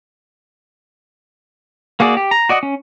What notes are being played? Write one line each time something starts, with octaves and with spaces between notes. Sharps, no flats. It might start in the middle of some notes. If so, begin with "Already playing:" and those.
A#3 F#4 G#4 D5
G4
A#5
F#4 D5 D#5 F#5
C#4